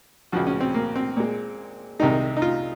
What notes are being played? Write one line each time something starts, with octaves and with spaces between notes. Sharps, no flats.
C#2 C#3 F3 F#4
C#4
C4
A#3
C4
A#2 G#3
C2 C3 D#3 G#3 D#4
D#4
F4